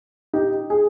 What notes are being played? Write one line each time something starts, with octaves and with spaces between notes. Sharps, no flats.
D#4 G4
G#4